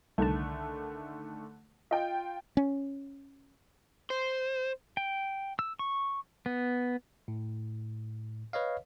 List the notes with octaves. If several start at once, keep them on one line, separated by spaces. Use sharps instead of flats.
C2 D3 D#3 A3 A5
F4 D#5 G5
C#4
C5
G5
E6
C#6
B3
A2
B4 C#5 D#5 F5